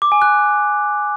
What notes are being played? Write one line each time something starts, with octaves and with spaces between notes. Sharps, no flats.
D6
G#5
F#6